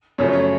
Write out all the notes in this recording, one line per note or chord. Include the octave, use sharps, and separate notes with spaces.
F#2 C#3 F3 A3 C#5
C#5